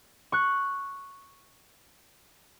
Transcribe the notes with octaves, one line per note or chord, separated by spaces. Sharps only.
C#6 F#6